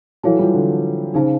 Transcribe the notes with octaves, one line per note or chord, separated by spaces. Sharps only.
E3 F#3 A4 C#5 F5 A5
F3 G3
D3
C#3 D#4 G#4 C5 F5 A5